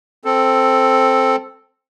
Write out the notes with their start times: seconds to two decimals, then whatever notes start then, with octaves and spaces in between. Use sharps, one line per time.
0.25 C4 A4